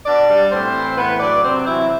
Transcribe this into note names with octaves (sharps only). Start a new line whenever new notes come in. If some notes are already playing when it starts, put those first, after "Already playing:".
B2 D4 D5
G3
A2 C4 C5
E3
A2 B3 B4
F#3 D4 D5
C3 C4 C5
E3 F#3 E4